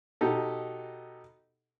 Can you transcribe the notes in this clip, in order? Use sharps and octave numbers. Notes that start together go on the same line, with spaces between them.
B2 D#4 G4 A4